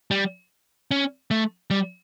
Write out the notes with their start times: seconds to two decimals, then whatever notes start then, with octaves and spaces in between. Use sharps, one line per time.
0.11 G3
0.91 C#4
1.31 A3
1.71 G3